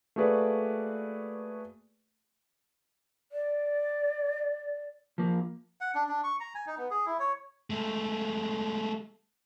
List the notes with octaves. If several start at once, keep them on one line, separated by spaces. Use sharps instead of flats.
A3 A#3 F#4 G#4 B4 D5
D5
F3 A#3
F#5
D4
D4
C#6
A#5
G#5
D#4
B3
G#4
E4
C#5
G#3 A3